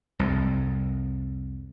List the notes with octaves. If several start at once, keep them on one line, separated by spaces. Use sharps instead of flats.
C2 F2